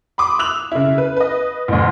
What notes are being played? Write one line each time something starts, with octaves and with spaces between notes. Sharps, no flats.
B5 C6 D6 D#6
E6 F#6 F7 F#7
C#3 E4
B4
B4 D#5
A1 D2